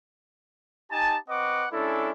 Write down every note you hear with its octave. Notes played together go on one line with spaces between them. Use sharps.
D#4 G4 G#5 A5
C4 B4 D#5 F#5 C#6 D6
G#3 C#4 D4 E4 A4